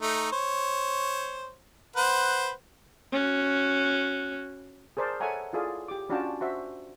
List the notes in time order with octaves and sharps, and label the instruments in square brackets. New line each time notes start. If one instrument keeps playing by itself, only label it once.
[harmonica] A3 D#4
C5 C#5
B4 C5 F#5
[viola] C#4 F#4
[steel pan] G#4 A#4 C5 D5 A5
A4 C#5 E5 F#5 G#5 A#5
E4 F4 G#4 A4 D5
G4 D6
C#4 D4 F4 F#4 G5 A5
F#4 C5 E5